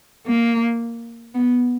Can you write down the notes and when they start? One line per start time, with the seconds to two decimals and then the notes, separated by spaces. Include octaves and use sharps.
0.28 A#3
1.34 B3